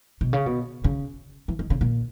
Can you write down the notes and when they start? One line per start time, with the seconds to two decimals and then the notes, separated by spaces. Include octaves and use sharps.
0.21 B2
0.33 C#3
0.46 B2
0.84 C#3
1.48 E3
1.59 D#3
1.70 C#3
1.81 A#2